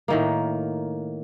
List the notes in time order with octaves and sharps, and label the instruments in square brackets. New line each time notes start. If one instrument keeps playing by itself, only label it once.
[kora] A2 D#3 A#3